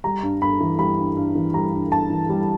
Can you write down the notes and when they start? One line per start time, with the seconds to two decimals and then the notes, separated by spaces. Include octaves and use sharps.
0.04 G3 A#5
0.23 G2
0.42 G2 B5
0.61 E3
0.79 G3 B5
0.98 G2
1.16 G2
1.35 E3
1.54 G3 A#5
1.73 G2
1.92 G2 A5
2.10 E3
2.29 G3